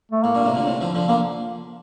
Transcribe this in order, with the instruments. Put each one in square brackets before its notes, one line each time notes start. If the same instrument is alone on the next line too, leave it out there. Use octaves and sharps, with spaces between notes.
[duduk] A3
[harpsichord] A2 [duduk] A#3
[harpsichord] G2 A#2
A2 C3
A#2 D3
A2 C3
D3 F3
D3 F3
[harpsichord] D3 F3 [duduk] A#3